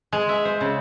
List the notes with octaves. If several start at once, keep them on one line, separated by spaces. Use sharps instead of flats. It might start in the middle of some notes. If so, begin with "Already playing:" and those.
G#3
E5
C5
C#3